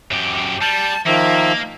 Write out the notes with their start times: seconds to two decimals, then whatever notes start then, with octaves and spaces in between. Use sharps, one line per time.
0.11 F#2 G4
0.61 G3 A5
1.06 D#3 F3 A#3 E5